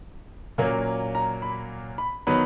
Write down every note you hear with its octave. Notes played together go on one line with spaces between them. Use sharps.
A#2 F#3 A#3 C#4
A#5
B5
B5
D#3 F#3 B3 B5